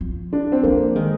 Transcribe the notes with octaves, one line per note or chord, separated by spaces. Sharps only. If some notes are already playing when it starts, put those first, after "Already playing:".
F3
D4
C4
F3 A#3
D#3 G#3